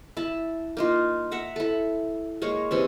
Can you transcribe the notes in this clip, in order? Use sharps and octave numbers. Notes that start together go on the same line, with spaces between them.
E4 A5
A#3 D#4 F4
E5 F#5 A#5
E4 A4
G#3 A#3 C#5
C3 E3 C#4